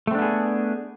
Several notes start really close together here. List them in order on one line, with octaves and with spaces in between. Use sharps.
A3 C4 D4 B3 G#4